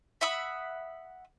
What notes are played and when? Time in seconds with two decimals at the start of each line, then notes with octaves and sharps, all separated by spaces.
0.21 E5 F#5 B5 D#6